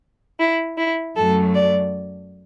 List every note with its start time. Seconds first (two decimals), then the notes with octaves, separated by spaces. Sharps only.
0.39 E4
0.77 E4
1.16 F#2 F#3 A3 A4
1.54 D5